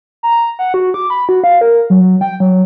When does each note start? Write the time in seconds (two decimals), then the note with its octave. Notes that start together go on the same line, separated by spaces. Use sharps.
0.23 A#5
0.59 F#5
0.74 F#4
0.94 D6
1.10 B5
1.29 F#4
1.44 F5
1.61 A#4
1.90 F#3
2.21 G5
2.40 F#3